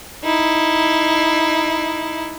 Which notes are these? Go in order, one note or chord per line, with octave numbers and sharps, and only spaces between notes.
D#4 E4